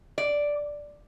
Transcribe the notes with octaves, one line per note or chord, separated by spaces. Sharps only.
D5